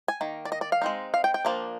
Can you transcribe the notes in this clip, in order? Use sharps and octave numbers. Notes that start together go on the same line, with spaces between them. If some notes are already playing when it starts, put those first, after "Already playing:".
G#5
D#3 A#3
D5
D#5
D5
F5
G#3 C4 D#4
F5
G5
G5
F3 A#3 D4